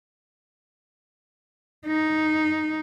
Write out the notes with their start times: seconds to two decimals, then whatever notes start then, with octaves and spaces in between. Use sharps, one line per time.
1.86 D#4